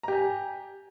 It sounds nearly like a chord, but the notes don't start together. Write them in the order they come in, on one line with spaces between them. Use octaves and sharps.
A#5 G4 G#5